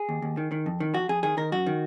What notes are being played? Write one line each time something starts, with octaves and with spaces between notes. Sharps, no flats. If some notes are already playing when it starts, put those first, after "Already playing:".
Already playing: G#4
D#2
D#2
D#3
D#3
F2
D#3
F2 F#4
F2 G#4
D#3 G#4
D#3 A#4
F#2 F#4
D#3